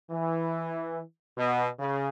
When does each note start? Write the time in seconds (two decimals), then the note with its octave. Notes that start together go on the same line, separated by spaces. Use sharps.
0.11 E3
1.37 B2
1.79 C#3